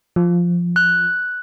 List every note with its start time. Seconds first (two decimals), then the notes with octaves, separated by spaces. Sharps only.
0.16 F3
0.76 F#6